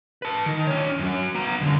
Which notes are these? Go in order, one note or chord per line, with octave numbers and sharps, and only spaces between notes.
B4 A5
D#3
D4 C#5
F#2 F#3
B3 A#5
F#2 D3